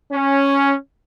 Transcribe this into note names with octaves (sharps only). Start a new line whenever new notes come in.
C#4